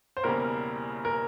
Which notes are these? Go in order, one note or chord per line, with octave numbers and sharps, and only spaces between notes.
C5
E1 E2 C#3 G3 A#3 A#4
A#4